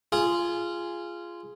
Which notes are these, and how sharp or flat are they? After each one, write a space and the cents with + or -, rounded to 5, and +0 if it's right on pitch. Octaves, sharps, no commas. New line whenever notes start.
F4 -15 G#4 +0